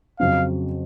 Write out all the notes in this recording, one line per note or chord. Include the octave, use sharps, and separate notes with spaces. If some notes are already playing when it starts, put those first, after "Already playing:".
F2 C#3 F#3 C4 F5